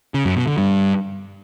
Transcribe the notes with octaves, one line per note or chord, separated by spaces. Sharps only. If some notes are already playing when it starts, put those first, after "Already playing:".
C#3
F#2
B2
D3
G2